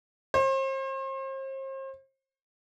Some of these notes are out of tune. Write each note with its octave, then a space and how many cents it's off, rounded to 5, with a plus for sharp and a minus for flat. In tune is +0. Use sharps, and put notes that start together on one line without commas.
C5 +40